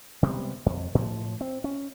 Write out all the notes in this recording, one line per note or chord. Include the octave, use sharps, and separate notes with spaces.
C3 G3 G#3 B3
F2
A2 F3
C4
C#4